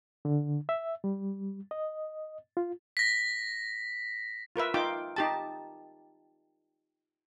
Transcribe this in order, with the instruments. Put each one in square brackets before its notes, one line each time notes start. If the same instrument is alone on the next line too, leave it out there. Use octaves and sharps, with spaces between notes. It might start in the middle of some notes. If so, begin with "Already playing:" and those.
[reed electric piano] D3
E5
G3
D#5
F4
[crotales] A#6 B6
[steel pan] F4 A#4 B4 E5
D#4 F4 G5 D6
D#4 G4 A5